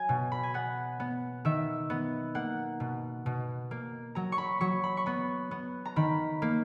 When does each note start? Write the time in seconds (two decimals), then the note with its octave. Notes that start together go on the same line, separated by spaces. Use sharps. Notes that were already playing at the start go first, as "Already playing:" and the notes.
Already playing: F#3 G#5
0.09 B2
0.32 B5
0.43 G#5
0.54 B3 F#5
1.00 B3
1.45 D#3 E5
1.90 B3
2.35 A#3 F#5
2.80 B2
3.26 B2
3.71 A#3
4.15 F#3 A#5
4.32 C#6
4.38 B5
4.60 F#3 C#6
4.84 B5
4.97 C#6
5.06 B3 B5
5.51 B3
5.85 A#5
5.96 D#3 B5
6.42 A#3